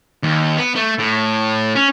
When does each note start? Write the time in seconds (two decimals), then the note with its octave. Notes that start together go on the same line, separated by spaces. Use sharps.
0.23 D#2
0.58 B3
0.75 A3
0.98 A2
1.76 C#4